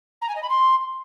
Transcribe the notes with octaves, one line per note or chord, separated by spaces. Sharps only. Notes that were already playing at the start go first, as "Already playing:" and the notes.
A#5
G#5
D#5
B5
C6